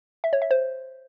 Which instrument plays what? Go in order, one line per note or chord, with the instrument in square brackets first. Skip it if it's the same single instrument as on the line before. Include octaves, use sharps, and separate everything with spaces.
[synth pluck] E5
C#5
E5
C5